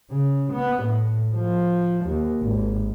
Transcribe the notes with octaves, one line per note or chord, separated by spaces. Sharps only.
C#3
B3
A2
F3
D#2
G#1